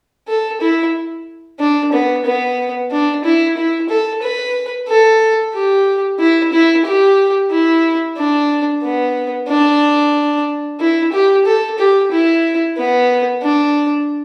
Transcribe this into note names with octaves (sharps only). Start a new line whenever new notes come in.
A4
E4
D4
B3
B3
D4
E4
E4
A4
B4
A4
G4
E4
E4
G4
E4
D4
B3
D4
E4
G4
A4
G4
E4
B3
D4